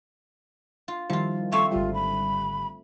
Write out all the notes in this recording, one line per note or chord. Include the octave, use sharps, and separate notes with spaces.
F4
D#3 F3 G3 E4 F4
A3 C4 F5 C#6
G#1 D3 G3 F4
B5